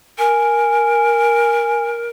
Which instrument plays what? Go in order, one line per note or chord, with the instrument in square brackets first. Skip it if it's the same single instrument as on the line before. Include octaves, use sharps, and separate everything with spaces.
[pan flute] A#4 [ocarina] G#5